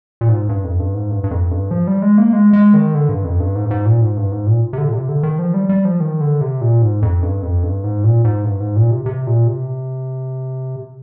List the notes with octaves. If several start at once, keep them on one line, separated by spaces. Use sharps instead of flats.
A#2
G#2
G2
F2
G2
G#2
G2
G2
F2
G2
F3
G3
G#3
A#3
G#3
G#3
D#3
D3
G2
F2
G2
G#2
G2
G#2
A#2
G#2
G2
G#2
A#2
C3
D3
A#2
C3
D3
D#3
F3
G3
G3
F3
D#3
D3
C3
A#2
G#2
F2
G2
F2
G2
G#2
A#2
G#2
G2
G#2
A#2
C3
C3
A#2
C3